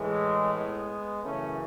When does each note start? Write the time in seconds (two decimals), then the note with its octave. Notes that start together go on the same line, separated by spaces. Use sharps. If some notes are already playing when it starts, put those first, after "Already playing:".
Already playing: A2 E3 G#3
0.54 G#3 B3
1.24 F#2 C#3 E3 A3 C#4